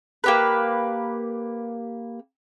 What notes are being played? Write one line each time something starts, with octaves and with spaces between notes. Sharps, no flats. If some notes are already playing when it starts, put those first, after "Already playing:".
A#3 G4 B4